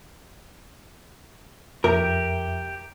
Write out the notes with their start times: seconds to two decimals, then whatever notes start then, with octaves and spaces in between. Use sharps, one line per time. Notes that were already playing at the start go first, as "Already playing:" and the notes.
1.84 F2 G4 A#4 E5